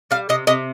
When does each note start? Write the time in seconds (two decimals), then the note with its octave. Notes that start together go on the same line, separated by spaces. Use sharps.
0.11 G3 F5
0.29 C3 D#5
0.47 C3 D#5